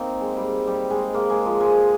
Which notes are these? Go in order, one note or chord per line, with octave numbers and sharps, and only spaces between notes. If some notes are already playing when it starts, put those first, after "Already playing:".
Already playing: A#3 C4 D#4
G#3
G3
G3
G#3
A#3
G#3
F3
G#3